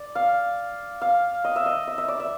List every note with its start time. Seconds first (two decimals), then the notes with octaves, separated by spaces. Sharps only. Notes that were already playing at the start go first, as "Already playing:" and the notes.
Already playing: D5
0.15 F5
1.01 F5
1.44 D#5
1.56 E5
1.66 D#5
1.88 E5
1.98 E5
2.08 D5
2.20 E5